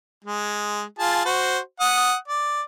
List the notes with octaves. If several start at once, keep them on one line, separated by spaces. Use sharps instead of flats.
G#3
F4 G#4 A5
F#4 C5
F#5 D#6
D5